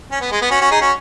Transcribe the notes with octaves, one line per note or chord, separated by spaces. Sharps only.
C#4
B3
G#3
B3
C#4 F#4
C#4 F#4
D#4 G#4
C#4 F#4